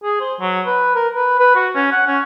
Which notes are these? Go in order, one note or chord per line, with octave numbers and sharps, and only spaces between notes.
G#4
C5
F#3
B4
A#4
B4
B4
F#4
C#4
F#5
C#4